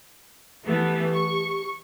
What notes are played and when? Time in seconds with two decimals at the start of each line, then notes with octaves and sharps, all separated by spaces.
0.65 E3 A3 B3 G4
1.13 C#6